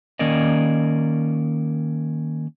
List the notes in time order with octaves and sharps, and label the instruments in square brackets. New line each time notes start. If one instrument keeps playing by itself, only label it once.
[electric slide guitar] D#3 A#3 C#4 A#4 D5 D#5